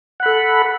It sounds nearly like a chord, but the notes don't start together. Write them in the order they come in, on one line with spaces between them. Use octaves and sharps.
F#5 B5 A4